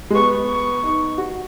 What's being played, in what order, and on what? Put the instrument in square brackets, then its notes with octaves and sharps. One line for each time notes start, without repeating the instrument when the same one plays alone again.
[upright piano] G#3
[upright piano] B3 [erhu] C#6
[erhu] C#6
[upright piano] D#4
F#4